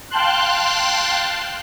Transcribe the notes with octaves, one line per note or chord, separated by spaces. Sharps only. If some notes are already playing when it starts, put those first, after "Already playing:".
F5 G5 A5 C6 F#6